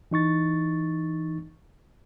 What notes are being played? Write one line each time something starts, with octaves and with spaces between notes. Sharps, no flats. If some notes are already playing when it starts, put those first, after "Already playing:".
E3 D#4 C#6 A6